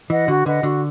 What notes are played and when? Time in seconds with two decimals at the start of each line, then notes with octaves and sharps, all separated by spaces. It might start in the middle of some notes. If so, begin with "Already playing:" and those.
0.10 E3 B4 D#5 F#5
0.28 D3 F#4
0.45 D3 B4 D#5 F#5
0.63 D3 F#4